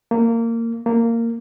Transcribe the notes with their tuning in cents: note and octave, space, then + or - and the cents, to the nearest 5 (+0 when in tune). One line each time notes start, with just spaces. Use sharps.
A#3 -20
A#3 -15